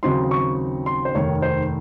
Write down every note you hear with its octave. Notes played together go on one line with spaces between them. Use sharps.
D#2 C#3 F#3 C4 D#4 C6
C#6
C6
C5
F1 D#2 D#3 C#5
C5